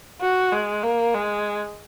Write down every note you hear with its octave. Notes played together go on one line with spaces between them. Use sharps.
F#4
G#3
A#3
G#3